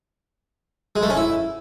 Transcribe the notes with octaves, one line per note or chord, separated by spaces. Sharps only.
G#3
A3
C#4
E4